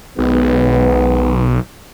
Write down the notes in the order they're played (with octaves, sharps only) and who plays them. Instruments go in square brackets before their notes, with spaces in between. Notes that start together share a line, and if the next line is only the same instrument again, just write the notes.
[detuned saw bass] B1 [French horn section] D#3 G#3 B3